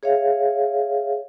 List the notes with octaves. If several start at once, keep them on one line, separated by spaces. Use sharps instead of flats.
G#4 C#5 E5 F5